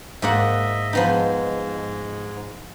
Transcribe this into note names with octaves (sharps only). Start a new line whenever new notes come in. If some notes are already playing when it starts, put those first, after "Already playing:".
G#2 A#3 D#5 E5 F#5
G#2 F3 B3 D#4